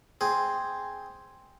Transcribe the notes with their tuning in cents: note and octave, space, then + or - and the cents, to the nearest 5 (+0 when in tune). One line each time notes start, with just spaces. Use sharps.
C4 +0 G#4 +0